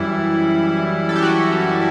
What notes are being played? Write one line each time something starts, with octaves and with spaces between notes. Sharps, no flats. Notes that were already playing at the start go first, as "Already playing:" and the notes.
Already playing: F#2 E3 G3 E4
A4
G4
F#4